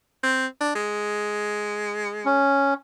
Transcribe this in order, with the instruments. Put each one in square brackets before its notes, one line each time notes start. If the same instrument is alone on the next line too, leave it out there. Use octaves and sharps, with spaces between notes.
[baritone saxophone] C4
D4
G#3
[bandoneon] C#4